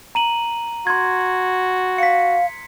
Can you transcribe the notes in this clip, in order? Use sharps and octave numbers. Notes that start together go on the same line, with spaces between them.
A#5 D#7 F#7
F#4 C6 G#6
F5 B6 C#7